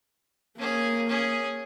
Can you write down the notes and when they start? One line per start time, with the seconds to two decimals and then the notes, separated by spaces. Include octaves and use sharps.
0.58 A#3 C#4 G#4
1.08 C#4 G#4